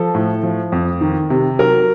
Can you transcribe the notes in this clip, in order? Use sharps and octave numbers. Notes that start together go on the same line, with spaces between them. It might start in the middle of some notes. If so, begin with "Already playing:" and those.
Already playing: F3 A4
A2
F3
F2
D#3
C3
F#3 A#4